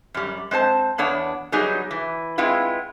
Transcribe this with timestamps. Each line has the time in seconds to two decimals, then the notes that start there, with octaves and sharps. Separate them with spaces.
0.14 F#2 G3
0.51 G#3 C4 C5 A5
0.98 E2 B3 D4 C#5 F#5
1.52 F#3 G3 B3 D#4 G#4
1.91 E3
2.38 G#3 B3 C4 E4 F4